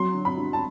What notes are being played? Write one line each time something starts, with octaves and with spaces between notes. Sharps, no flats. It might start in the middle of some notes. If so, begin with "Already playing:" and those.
Already playing: F#3 C6
D3
B5
G2
A5